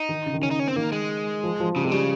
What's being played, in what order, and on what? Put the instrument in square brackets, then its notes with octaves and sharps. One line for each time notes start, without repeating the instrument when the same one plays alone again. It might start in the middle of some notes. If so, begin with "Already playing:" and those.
Already playing: [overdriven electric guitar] D#4
[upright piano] D#3
C#3
D#3
[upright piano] C#3 [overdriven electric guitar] C#4
[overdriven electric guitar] D#4
C#4
C4
[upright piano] D#3 [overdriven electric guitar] A#3
[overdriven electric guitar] G#3
[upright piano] F3
F3
[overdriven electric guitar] C#3 [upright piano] G3
[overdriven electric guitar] C3 [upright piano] G#3
[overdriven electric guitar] C#3 [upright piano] G3